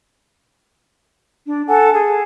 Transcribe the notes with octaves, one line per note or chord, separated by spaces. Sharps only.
D4
A4 F#5 G#5
G#4